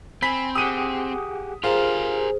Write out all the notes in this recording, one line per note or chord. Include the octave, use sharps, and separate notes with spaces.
C4 G#5 B5 B6
G4 G#4 F#5 D#6 D#7
F4 G4 G#4 A#4 C5 G#5 A#5 C6